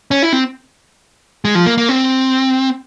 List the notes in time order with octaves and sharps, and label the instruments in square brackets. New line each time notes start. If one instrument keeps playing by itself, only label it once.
[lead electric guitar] C#4
E4
C4
G#3
F3
A#3
A#3
C4